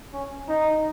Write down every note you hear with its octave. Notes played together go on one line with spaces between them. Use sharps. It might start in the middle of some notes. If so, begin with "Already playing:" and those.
C#4
D#4